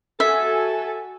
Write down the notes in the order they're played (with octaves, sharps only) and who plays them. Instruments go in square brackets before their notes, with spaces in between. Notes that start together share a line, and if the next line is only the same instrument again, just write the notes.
[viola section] F#4 G#5 [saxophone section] A4 [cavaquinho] E5